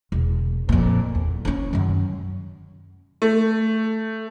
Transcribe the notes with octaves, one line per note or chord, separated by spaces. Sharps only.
E1
F2 A#2
E2
A#3 C#4
F#2 D#3
A3